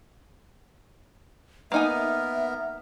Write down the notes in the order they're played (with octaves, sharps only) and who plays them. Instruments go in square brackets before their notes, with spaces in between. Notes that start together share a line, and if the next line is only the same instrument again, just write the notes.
[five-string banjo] A#3 D#4 G#5 [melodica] B3 A#4 [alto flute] E5